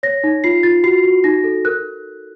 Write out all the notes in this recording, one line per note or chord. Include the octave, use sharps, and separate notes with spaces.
C#5 A#6
D#4
F4 C7
F4 A6
F#4 C7
F#4
D#4 A#6
A4
A#4 F#6